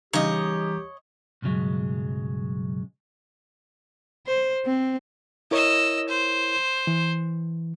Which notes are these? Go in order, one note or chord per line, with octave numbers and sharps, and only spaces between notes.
C#3 E3 G3 D#4 G4 C#5 D#5 A#5
B1 G2 C#3 F#3 G#3
C5
C4
E4 A#4 C#5 D#5 E6
C5
E3